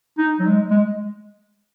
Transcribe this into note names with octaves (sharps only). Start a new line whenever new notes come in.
D#4
F#3
G#3
G#3